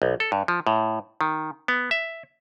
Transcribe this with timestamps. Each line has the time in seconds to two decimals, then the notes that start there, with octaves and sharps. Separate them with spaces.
0.02 B1
0.20 A4
0.32 G2
0.48 F3
0.67 A2
1.21 D#3
1.68 B3
1.91 E5